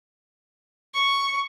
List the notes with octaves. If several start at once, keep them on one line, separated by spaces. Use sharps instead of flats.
C#6